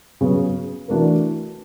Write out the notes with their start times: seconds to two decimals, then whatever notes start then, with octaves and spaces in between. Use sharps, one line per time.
0.21 C#3 F#3 B3
0.88 E3 A3 D4 F#4 A#4